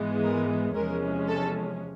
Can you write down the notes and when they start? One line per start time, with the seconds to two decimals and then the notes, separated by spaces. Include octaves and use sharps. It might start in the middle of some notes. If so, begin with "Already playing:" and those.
Already playing: G#2 E3 G#3 B3
0.23 A#4
0.75 E2 C3 F3 G#3 C#4 A#4
1.28 A4